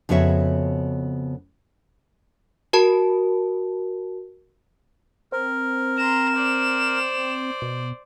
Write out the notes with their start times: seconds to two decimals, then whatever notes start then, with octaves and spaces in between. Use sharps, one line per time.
0.09 F2 C#3 B3 F#4 C#5 E5
2.73 F#4 A#4 A5
5.32 C4 A#4
5.98 A#5 C6 E7
6.34 C5 D5
7.62 B2